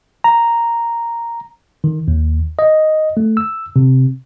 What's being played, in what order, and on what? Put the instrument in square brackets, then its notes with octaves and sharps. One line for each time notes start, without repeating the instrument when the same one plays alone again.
[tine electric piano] A#5
D#3
D#2
D#5
A3
E6
C3